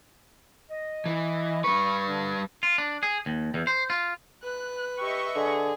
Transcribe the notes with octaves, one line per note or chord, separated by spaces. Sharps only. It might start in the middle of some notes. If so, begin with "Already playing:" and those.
D#5
E3
G3 B4 C#6
D3 D4
F4
D4
G#4
D#2
E2
C5
F4
B4 F#6
G4 D#5 E5 C#6
D3 G#4